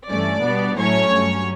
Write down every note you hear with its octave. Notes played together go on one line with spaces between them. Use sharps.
G2 E3 A3 C#4 D5
B2 G3 B3 D4
A2 F#3 A3 C#4 C#5
G2 F#3 C#4